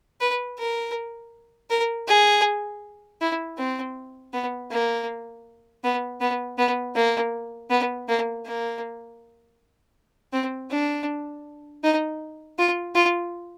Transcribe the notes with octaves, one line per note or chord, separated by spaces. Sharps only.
B4
A#4
A#4
G#4
E4
C4
B3
A#3
B3
B3
B3
A#3
B3
A#3
A#3
C4
D4
D#4
F4
F4